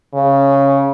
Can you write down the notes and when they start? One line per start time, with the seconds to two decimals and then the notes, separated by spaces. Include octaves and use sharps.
0.14 C#3